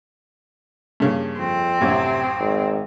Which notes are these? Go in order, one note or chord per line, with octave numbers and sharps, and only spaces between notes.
G2 C#3 A#3
F2 C4
A1 F#2 A2 C3
G#1